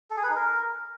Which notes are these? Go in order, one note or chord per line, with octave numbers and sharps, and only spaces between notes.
A4
G#4
B4
D#4
A#4